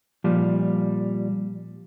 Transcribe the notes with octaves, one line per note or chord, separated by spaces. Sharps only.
A#2 F3 G3